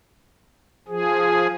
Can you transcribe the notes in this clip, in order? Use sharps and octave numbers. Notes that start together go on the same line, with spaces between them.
F3 G#4